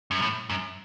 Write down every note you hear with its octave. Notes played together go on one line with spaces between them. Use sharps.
F#2
A2
F#2